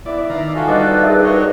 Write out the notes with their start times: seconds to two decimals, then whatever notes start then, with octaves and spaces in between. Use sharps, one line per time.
0.06 B3 E4 D5 E5
0.29 D#3 D5 F5 A#5
0.55 F4 F#4 A4 G#5
0.68 G3 D4 D#4 B4 C5 D#5 D6
1.03 G#4 A#4 E5
1.24 F#4 A#4 C#5 D#5 F#5